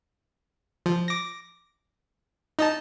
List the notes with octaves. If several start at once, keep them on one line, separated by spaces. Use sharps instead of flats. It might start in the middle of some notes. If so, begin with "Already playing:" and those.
F3
D6 A#6
D#4 D#5 A5